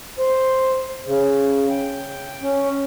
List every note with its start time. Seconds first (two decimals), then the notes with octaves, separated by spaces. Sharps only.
0.19 C5
1.06 C#3
1.70 G5
2.41 C#4